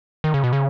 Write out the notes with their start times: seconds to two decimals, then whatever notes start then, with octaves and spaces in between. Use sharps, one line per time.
0.24 D#3
0.34 C#3
0.44 B2
0.53 C#3